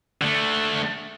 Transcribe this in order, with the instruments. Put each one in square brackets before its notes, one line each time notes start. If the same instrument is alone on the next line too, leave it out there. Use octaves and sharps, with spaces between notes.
[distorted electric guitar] D3 A3